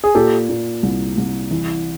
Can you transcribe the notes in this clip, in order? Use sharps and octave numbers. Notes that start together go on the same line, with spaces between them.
G#4
A#2 G4 A4
A#2
C2
C2
E3